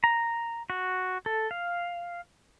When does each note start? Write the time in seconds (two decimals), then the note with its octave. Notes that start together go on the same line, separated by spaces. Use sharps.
0.04 A#5
0.70 F#4
1.26 A4
1.51 F5